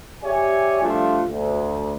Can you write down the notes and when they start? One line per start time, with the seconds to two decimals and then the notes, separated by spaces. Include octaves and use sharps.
0.23 G4 G#4 C#5 D5 E5 G#5
0.82 F3 G3 A3 D4 F4
1.27 D2